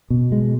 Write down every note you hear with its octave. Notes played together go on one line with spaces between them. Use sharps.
B2
G#3